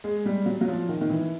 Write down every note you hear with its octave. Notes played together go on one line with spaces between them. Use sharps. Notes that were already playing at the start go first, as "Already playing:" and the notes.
G#3
G3
F#3
F#3
F3
D#3
D#3
E3